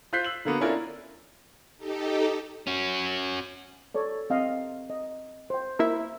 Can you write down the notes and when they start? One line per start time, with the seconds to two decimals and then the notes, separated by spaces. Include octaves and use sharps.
0.13 F4 C5 F#6 G6 B6 C7
0.24 E6 F#7
0.45 D3 A#3 B3 F#4
0.61 C#4 D4 E4 F4 A#4 D5
1.78 D#4 G4 A4
2.67 C#4 F#4
3.95 A4 C#5 D5
4.30 C4 D#5 F5
4.90 D#5
5.50 C5 G5
5.79 A#3 E4 E5